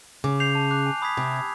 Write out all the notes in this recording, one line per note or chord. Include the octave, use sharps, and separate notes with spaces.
C#3 D6
G6 C7 F7
A5
D6 F#6
G#5
B5 D#6 G#6 B6
C3 B5
E6 G#6